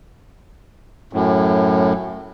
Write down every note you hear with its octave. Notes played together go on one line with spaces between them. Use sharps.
F#2 A2